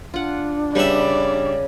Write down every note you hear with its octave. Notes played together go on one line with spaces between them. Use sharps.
D4 F4 F#5
C#3 G3 B4 D5 E5 F#5